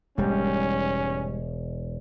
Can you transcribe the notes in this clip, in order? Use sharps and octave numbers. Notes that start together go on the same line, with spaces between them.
E1 G#2 G3 C#4